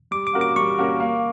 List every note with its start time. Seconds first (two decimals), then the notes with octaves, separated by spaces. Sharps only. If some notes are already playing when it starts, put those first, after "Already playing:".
0.11 G3 D6
0.27 D6
0.33 A#3 C#4 F#4 A#4
0.41 D6
0.56 G3 C#6
0.78 A#3 C#4 F#4 A#4
1.00 A#3